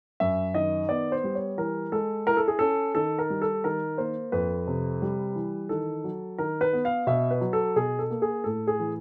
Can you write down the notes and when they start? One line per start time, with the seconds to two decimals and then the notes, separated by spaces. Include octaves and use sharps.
0.20 F#2 E5
0.55 D#3 D#5
0.89 B3 D5
1.12 C5
1.24 G3
1.35 C#5
1.58 E3 A#4
1.92 G#3 A4
2.27 E4 A#4
2.37 A4
2.48 G#4
2.59 C#4 A4
2.95 D#3 A4
3.19 A#4
3.30 G3
3.42 A4
3.64 D#3 A#4
3.98 A#3 C5
4.32 F2 B4
4.67 C3
5.02 G3
5.35 E3
5.69 D#3 A4
6.04 F#3
6.38 D#3 A#4
6.61 B4
6.73 B3
6.85 F5
7.07 B2 E5
7.31 B4
7.41 F#3
7.53 A4
7.76 B2 G#4
7.99 A4
8.11 A#3
8.22 G#4
8.44 A2 A4
8.67 G#4
8.79 E3